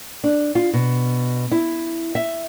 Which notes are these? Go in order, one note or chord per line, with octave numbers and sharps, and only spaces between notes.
D4
F4
B2
E4
E5